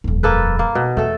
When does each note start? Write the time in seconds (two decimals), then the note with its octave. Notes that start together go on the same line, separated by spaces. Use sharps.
0.04 D#1 F2
0.23 A#3 A4 B4
0.59 A#3
0.75 B2
0.97 E2 A3 A4